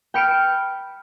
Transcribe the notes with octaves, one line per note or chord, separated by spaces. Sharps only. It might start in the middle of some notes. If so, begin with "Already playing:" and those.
G5 B5 F6 C#7 D7 E7